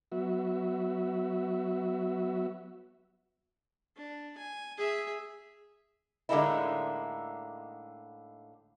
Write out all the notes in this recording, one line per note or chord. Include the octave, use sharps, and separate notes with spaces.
F#3 B3 F#4 E5
D4
G#5
G#4 E5
A2 D3 G#3 A#3 D#4 E4